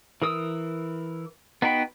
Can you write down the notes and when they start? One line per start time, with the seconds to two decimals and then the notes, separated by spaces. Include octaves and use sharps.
0.22 E3 A#4 D#6 E6
1.62 B3 D#4 F#4 G5 B5